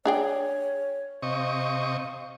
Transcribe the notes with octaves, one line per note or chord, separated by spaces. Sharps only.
D4 G#4 C#5 G5
C3 D#5 F5 C#6